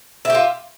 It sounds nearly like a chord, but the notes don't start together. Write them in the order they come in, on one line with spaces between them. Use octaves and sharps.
E5 G4 F4